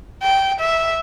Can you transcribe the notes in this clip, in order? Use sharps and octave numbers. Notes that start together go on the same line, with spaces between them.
G5
E5